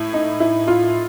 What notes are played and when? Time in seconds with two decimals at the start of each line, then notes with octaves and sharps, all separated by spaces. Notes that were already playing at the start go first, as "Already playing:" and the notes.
Already playing: A2 E4
0.14 D#4
0.40 E4
0.68 F4